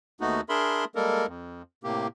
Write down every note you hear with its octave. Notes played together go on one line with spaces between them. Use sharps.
D#2 A3 B3 D#4 F#4
D4 G#4 A#4 E5 B5 C6
G3 G#3 A#3 A4 A#4
F2
A2 C3 A#3 G4